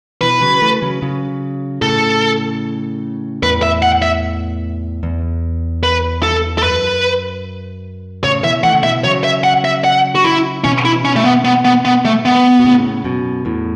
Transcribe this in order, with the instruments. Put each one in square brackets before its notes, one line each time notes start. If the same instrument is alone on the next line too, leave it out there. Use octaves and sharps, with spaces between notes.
[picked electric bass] B2 E3 [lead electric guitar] B4
[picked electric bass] C#3 F#3
E3 A3
C#3 F#3
C#3 F#3
[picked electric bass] A2 C#3 [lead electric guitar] A4
[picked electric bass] E2 A2 [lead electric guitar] B4
[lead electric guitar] E5
F#5
E5
[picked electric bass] E2
[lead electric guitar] B4
A4
A4
[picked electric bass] F#2 [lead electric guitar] B4
[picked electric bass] A2 C#3 [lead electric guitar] C#5
[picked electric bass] B2 E3 [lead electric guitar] E5
[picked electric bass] E3 A3 [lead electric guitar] F#5
[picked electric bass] C#3
[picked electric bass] B2 E3 [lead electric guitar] E5
[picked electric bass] C#3 F#3 [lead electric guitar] C#5
[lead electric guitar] E5
F#5
E5
F#5
F#4
E4
[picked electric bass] B2 E3 [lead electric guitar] C#4
[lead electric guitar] E4
C#4
A3
B3
B3
B3
B3
A3
B3
[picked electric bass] B2
A2 C#3
F#2 B2
E2 A2